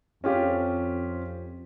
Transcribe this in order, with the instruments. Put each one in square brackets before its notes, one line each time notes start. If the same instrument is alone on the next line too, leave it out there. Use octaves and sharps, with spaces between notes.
[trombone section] F2 [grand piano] C#4 F4 G4